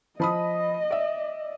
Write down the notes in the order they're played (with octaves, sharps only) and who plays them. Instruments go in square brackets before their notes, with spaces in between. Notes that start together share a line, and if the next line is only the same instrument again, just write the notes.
[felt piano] F3 B5 D#6 [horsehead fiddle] D#5
[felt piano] D5 E5